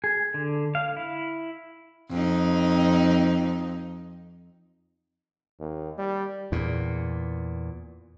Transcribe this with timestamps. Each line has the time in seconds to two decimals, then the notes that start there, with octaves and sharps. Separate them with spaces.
0.04 G#4
0.34 D3
0.75 F5
0.97 E4
2.10 F2 D#4
5.60 D#2
5.98 G3
6.52 E2 A#2